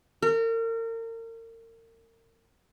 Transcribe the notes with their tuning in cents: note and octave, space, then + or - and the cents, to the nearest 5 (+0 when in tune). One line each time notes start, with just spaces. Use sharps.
A#4 -35